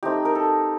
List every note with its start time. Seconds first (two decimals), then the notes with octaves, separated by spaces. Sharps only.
0.03 A3 C4 D#4 G4
0.25 A#4
0.35 A4